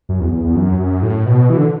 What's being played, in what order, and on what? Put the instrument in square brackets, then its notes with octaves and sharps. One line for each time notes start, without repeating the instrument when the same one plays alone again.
[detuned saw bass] F#2
E2
E2
E2
F#2
F#2
A2
B2
E3
D3